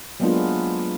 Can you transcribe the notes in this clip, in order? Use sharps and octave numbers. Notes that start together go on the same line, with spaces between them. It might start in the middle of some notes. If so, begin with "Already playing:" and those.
F#3 G#3 A#3 B3 D4 F4